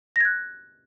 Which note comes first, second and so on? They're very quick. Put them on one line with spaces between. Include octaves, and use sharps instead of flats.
A#6 G#6 F#6